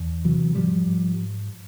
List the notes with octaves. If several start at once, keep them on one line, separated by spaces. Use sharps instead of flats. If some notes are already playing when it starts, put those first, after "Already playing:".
Already playing: E2
C3 E3 F#3
G#2 F3 G3
G#2